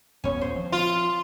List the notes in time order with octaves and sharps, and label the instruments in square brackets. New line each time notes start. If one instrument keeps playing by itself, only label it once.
[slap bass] D#1 B3 [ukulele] C#4 C#5
[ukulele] C5
[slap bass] F3 C4
[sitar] F4